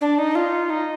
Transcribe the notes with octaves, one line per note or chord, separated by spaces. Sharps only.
D4
D#4
F4
D#4